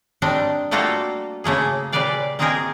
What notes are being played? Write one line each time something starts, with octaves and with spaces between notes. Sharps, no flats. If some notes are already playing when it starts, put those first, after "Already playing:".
G3 A3 C4 D4 D#4
G3 A3 A#3 F4 F#4 A4
C#3 A3 A#3 G#4
A#2 C#3 G3 B4 D5 F5
A#3 C4 D#4 F4 G#4 A#4